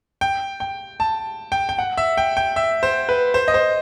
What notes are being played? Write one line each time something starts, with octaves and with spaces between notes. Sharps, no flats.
G5
G5
A5
G5
G5
F#5
E5
G5
G5
E5
C5
B4
C5
D#5
C5